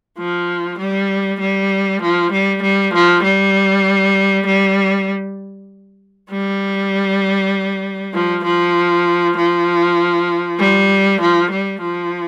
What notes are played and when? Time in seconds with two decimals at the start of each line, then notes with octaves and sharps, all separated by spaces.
0.18 F3
0.79 G3
1.40 G3
2.02 F3
2.32 G3
2.62 G3
2.94 F3
3.23 G3
4.46 G3
6.31 G3
8.14 F3
8.44 F3
9.37 F3
10.59 G3
11.21 F3
11.51 G3
11.81 F3